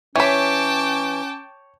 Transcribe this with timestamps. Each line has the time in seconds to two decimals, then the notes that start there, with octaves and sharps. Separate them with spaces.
0.16 E3 C#4 C#5 G5 A5 B5 D6